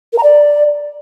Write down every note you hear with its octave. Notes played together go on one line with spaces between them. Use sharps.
A#4
A#5
D5